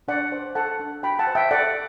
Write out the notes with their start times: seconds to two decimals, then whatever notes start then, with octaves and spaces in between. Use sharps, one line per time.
0.08 D4 D5 F#5
0.32 C5
0.55 A4 F#5 A5
0.80 D4
1.03 F#4 G5 B5
1.19 F#5 A5
1.27 C5
1.35 E5 G5
1.51 A4 D5 F#5